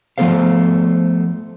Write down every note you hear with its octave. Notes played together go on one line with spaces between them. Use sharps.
F3 A3 B3 A4 C5 F5